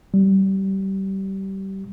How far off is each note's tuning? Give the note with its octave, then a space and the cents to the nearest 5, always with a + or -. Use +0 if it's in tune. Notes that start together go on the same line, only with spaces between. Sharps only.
G3 -25